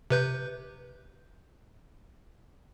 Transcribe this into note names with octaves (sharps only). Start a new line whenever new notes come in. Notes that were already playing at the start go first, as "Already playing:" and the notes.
C3 B4 G6